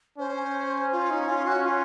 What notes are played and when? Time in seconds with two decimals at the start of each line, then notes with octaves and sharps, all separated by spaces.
0.18 C#4 C5
0.92 F4
1.10 D#4
1.28 F4
1.47 F#4
1.66 F4